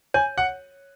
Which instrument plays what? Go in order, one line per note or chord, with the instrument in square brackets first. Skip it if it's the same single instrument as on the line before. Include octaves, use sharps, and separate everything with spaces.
[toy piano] C#5 [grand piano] G#5
[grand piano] F#5